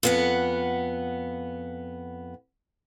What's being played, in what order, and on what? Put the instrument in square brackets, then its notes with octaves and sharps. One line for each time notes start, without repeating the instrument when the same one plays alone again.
[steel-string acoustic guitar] F2 B3 F#5